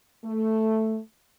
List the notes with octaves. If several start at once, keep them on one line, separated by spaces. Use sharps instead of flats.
A3